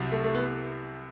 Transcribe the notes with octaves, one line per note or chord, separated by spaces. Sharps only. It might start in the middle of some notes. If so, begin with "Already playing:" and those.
Already playing: C2 C3 F#3
A3
A3
B3